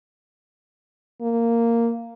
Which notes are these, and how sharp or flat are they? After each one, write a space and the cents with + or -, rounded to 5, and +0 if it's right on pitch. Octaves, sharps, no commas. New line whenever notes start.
A#3 -10